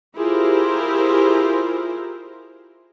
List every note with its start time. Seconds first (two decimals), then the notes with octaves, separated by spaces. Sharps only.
0.17 E4 F4 G4 G#4 A#4 C5